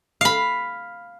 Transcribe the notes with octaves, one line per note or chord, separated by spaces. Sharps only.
F5 B5